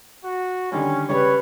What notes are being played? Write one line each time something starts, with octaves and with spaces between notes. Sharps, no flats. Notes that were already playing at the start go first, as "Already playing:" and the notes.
F#4
D3 D#3 G3 C#4
C#3 G3 B4 C#5